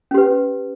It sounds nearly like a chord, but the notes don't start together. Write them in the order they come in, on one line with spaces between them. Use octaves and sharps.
C#4 G4 B4